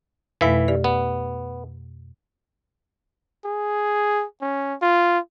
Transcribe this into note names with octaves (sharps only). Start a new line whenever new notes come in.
F2 B2 E3 A3 E5
G4 D5
B3
G#4
C#4
F4